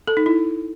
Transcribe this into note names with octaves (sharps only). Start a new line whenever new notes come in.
A4
D#4
E4